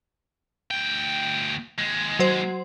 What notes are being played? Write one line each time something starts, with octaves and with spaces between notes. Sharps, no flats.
D2 G5
D#2 G#3
F#3 C5